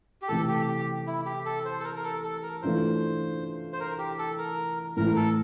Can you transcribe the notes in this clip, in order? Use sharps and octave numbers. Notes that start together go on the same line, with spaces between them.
G4
C3 E3 A3 A4
G4
G4
E4
G4
A4
C5
A4
A#4
A#4
A4
A4
A#4
E3 A3 D4 F4 C5
C5
A#4
G4
A4
A#4
A2 E3 A3 E4 A#4
A4